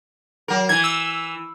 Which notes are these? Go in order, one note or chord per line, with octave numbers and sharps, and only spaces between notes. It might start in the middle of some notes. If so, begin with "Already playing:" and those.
F#3 A#4
E3 G#6
E6